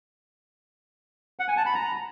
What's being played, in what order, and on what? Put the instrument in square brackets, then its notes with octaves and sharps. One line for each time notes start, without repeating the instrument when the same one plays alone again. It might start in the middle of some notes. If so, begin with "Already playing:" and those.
[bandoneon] F#5
G#5
A5
B5
A#5